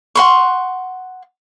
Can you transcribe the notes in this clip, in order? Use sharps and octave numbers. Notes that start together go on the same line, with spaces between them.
F#5 C6 C#6